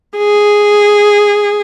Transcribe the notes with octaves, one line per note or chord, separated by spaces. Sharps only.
G#4